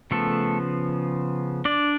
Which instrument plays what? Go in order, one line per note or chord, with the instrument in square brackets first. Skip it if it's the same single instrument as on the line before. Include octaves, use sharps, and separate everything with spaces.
[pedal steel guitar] C#3 F3 A3 B3 A4
D4 D5